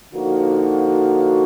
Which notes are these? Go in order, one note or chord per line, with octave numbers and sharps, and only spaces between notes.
D3 F3 A#3 D#4 F#4